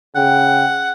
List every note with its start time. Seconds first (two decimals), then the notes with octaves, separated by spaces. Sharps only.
0.16 C#3 F#5 G5